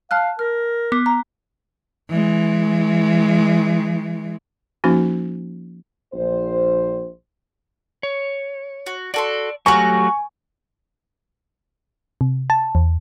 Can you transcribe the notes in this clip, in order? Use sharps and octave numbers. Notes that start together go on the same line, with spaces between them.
F5 A5 F6 F#6
A#4 F6
B3 D6
A#5
E3 G#3
F3 A#3 C#4 D#4 F#4
A#1 C5
C#5
F#4
F#4 A4 D5 C6
F#3 A3 F#4 G4 F5 G#5 A#5 C#6
C3
A5
E2